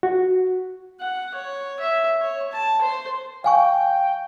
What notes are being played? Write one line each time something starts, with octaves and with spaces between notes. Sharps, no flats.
F#4
F#5
C#5
E5
C#5
A5
C5
F5 G5 G#5 C#6